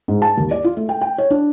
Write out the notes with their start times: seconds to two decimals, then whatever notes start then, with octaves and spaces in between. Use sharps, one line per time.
0.08 G#2
0.22 A5
0.38 D#2
0.51 D5
0.64 F4
0.77 A3
0.89 G5
1.01 G5
1.18 C#5
1.30 D4